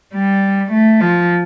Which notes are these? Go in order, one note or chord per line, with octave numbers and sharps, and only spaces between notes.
G3
A3
F3